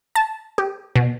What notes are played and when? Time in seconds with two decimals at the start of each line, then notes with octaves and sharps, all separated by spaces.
0.15 A5
0.58 G4
0.96 B2